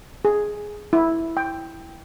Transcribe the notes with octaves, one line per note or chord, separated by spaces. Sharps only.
G#4
E4
G5